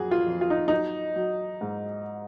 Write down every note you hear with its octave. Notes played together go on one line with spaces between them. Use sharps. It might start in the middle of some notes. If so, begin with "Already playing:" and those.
Already playing: F2 F#3 F#4 G#4
F4
F2
F4
D#4
F#3 D#4
F#3
G#2